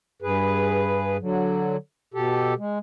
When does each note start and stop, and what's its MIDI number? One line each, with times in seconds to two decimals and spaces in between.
0.22 1.17 43
0.22 1.17 68
0.22 1.17 71
1.20 1.77 50
1.20 1.77 54
2.14 2.54 47
2.14 2.54 67
2.14 2.54 69
2.58 2.79 56